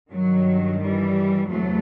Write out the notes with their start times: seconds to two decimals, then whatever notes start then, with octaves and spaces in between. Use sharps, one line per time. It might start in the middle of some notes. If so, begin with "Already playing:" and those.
0.11 G2 D#3 F#3
0.80 E3 G3
1.49 E2 C3 E3 F#3 A3